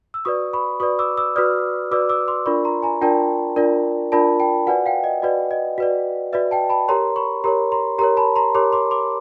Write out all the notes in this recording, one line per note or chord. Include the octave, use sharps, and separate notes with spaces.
E6
F#4 B4 D5 C#6 D#6
B5 C#6
F#4 B4 D5 C#6 D#6
D6 E6
D6 E6
F#4 B4 D5 D#6 F6
F#4 B4 D5 D6 E6
D6 E6
C6 D6
D4 F4 A#4 D5 B5 C#6
A#5 C6
G#5 A#5
D4 F4 A#4 D5 G5 A5
D4 F4 A#4 D5
D4 F4 A#4 D5 A5 B5
G5 A5
F#4 B4 D5 F#5 G#5
F5 G5
D#5
F#4 B4 D5 D#5
D#5
F#4 B4 D5
F#4 B4 D5 E5
G5 A5
A5 B5
G4 A#4 C#5 A#5 C6
B5 C#6
G4 A#4 C#5 A#5 C6
A#5 C6
G4 A#4 C#5 A#5 C6
A5 B5
A#5 C6
G4 A#4 C#5 C6 D6
C6 D6
C6 D6